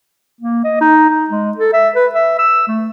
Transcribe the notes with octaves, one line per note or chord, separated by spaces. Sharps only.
A#3
D#5
D#4
D#4
G#3
A4
E5
B4
E5
E6
A3